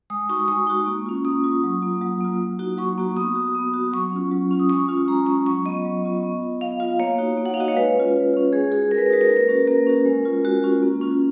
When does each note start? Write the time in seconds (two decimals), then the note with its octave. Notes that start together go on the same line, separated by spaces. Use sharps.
0.10 G#3 D#6
0.29 D#4 F#4 C#6
0.40 D#6
0.48 G#3 C#6
0.67 D#4 F#4
0.86 A#3
1.06 C#4 F4
1.25 A#3 D#6
1.44 C#4 F4
1.63 F#3
1.82 A#3 F4
2.02 F#3
2.21 A#3 F4
2.40 F#3
2.59 A#3 D#4 F#4
2.78 F#3 C#6
2.98 A#3 D#4 F#4
3.16 B3 D#6
3.35 F#4
3.55 B3
3.74 F#4
3.93 F#3 C#6
4.12 C#4 F4
4.31 F#3
4.51 C#4 F4
4.59 D#6
4.69 G#3 C#6
4.89 C#4 F4
5.08 G#3 A#5
5.26 C#4 F4 C#6
5.46 F#3 C#6
5.65 B3 F4 D#5
5.85 F#3
6.04 B3 F4
6.23 B3
6.42 F4
6.61 B3 F5
6.80 F4 F5
6.99 A#3 C#5
7.18 D#4 F#4
7.37 A#3
7.46 F#5
7.54 F5
7.57 D#4 F#4 D#5
7.68 C#5
7.76 G#3 B4
7.95 C#4 F4
8.14 G#3
8.34 C#4 F4
8.53 G#3 G#4
8.72 D#4 F#4 G#4
8.91 G#3 A#4
8.98 B4
9.06 A#4
9.10 D#4 F#4 B4
9.21 A#4
9.29 A#3 B4
9.37 A#4
9.48 C#4 F#4
9.67 A#3 A#4
9.87 C#4 F#4
10.06 G#3
10.25 C#4 F4
10.44 G#3 F#4
10.64 C#4 F4
10.82 A#3
11.02 C#4 F4